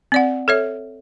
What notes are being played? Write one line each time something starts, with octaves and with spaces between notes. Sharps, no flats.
C4 D5 F#5
A4 C#5 E5